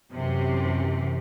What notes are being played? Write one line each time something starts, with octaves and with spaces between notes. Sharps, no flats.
F#2 C3 E3